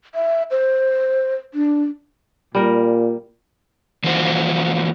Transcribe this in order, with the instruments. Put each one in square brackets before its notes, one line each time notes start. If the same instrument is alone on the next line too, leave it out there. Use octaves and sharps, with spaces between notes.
[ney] E5
C5
D4
[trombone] A#2 [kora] G3 A#4
[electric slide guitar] E3 F3 A#3 F#4 C5